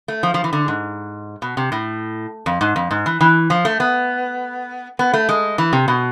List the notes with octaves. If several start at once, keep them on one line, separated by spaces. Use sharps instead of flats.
A3
F3
F3
E3
D3
G#2
B2
C3
A2
F2
G#2
F2
G#2
E3
E3
F3
A3
B3
B3
A3
G#3
E3
C3
B2